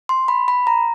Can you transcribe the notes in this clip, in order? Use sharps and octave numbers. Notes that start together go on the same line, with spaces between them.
C6
B5
B5
A#5